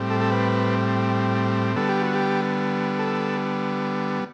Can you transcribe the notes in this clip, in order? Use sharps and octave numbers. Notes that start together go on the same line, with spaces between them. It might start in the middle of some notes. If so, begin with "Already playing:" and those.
Already playing: A2 G3 C4
A4
A4
B4
D3 G3 B3 A4
G4
F#4
G4
A4